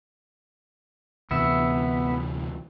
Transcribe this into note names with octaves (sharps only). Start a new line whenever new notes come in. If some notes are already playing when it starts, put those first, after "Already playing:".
D2 C3 E3 B3 E5